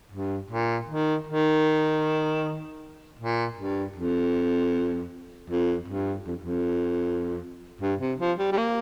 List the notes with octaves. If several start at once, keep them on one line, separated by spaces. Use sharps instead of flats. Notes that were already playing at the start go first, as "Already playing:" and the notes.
G2
A#2
D#3
D#3
A#2
G2
F2
F2
G2
F2
F2
G2
C3
F3
G3
G3
A#3